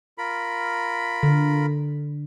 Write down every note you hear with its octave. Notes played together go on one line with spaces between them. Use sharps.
F4 A#4 B5
D3